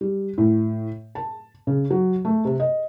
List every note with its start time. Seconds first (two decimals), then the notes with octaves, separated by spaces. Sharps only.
0.01 G3
0.38 A2
1.15 A5
1.67 C#3
1.91 F#3
2.25 A3
2.45 C3
2.60 D#5